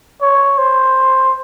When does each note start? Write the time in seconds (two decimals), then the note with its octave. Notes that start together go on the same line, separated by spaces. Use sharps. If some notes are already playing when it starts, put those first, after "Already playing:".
0.22 C#5
0.58 C5